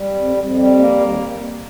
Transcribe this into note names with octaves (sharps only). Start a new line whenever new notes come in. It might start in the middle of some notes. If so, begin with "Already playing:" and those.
Already playing: G3
F2
F2
G3
A#3
D#2